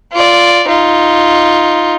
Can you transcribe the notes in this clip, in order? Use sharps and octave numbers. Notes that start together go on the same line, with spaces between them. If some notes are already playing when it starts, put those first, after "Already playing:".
F4 D5
D#4 F4